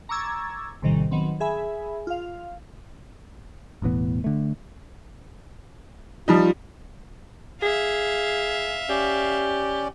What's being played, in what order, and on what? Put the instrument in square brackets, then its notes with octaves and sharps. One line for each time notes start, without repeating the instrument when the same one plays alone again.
[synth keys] A#5 C#6 D6 E6 G#6 A6
A#1 A2 C3 D#3 G3
D#3 F#3 B3 C4
G#4 E5 G#5 B5
F4 F5
[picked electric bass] E1 A2 E3 B3
D3 A3
[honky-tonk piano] F3 G3 D#4 [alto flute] F4
[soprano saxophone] G#4 [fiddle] E5 F5
[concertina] C#4 D5 [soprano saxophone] G4